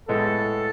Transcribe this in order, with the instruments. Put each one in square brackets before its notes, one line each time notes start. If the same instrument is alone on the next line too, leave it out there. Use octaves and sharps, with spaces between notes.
[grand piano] A2 G#3 B3 [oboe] A4